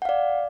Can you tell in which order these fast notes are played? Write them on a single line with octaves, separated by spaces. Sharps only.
F#5 F5 D5